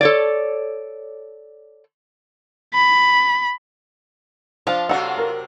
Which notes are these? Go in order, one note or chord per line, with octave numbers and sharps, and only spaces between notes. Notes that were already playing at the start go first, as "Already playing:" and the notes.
A4 C#5 D5
B5
F3 D4 F4
C3 F#3 D4 F#4 A4 F#5
A#4